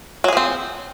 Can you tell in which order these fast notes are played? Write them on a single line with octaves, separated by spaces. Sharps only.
F#3 G#4 F3 C4